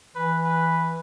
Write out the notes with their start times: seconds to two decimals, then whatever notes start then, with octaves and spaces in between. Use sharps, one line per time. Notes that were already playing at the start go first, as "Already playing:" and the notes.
0.15 E3 B4
0.44 B4